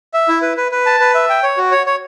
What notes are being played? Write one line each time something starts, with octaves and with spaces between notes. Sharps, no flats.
E5
E4
B4
B4
B4
A5
B4
E5
G5
C#5
F#4
C#5
C#5